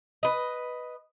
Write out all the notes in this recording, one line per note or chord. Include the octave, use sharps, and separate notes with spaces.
B4 D#5